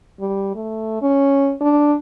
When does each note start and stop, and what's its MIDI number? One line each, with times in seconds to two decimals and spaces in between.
0.20 0.53 55
0.55 1.01 57
1.02 1.54 61
1.61 1.96 62